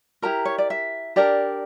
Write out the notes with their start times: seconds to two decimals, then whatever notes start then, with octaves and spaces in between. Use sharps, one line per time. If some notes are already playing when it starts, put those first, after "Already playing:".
0.22 E4 G4 A#4 A#5
0.45 C#5
0.58 D5
0.70 E5
1.16 D4 G4 A#4 D5